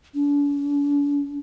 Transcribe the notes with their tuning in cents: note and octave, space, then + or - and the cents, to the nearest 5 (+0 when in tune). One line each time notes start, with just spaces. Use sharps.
D4 -45